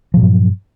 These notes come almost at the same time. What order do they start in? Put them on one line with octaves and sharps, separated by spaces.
F3 A#2 F#3 G2